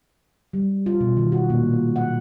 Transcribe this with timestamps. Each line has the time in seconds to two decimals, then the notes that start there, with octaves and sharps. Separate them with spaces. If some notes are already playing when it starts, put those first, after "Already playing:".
0.53 G3
0.86 F4
1.01 B2
1.17 D#3
1.32 F#4
1.50 A#2
1.73 G#3
1.96 F#5